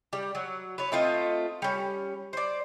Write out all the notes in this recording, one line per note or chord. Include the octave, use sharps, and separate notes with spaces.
G3
F#3
B4 C#5
A3 C4 F4 D#5
G3 C#4
C5 D5